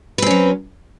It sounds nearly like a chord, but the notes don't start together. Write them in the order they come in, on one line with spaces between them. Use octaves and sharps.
B4 C4 C#4 F#3